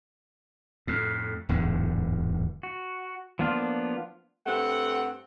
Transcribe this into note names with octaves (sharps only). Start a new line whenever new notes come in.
F2 A2
D1 E2 G#2 D3
F#4
F3 A#3 B3 D4 F4
G2 A3 C4 F#5